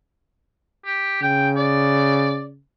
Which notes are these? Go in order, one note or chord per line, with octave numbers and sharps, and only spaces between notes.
G4
C#3 G5
D5